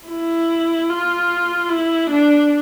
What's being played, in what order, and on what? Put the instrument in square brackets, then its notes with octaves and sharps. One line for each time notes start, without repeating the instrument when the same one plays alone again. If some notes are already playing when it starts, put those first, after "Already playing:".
[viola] E4
F4
E4
D4